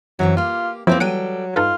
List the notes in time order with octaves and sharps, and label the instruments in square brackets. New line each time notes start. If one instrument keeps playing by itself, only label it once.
[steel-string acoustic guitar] F#2 E3 C4 [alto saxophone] F#3
[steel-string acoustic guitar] A#3 G4 [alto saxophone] F4
[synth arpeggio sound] F3 F#3 E4 [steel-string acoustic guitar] A#3 A4 B4 [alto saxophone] C4
[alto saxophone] F#3 [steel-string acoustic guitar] G3 A4 G5 [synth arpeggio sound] F#5 D7 D#7
[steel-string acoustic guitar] G2 [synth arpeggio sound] D#4 A4 B4 [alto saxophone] F4